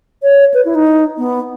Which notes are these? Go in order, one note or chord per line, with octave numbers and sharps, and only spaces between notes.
C#5
B4
E4
D#4
B3